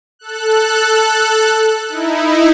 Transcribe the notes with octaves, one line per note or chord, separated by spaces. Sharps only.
A4 F#6
D#4 E4